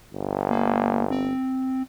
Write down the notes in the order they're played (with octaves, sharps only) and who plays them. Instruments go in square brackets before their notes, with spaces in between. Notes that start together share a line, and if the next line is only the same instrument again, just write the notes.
[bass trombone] G1
[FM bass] A#3
C4